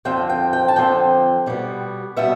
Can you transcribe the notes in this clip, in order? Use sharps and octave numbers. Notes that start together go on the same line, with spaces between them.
F2 D3 F3 C4 G5
G5
G5
A5
F2 D3 F3 C4 G5
B2 G3 B3
B2 G3 B3 E5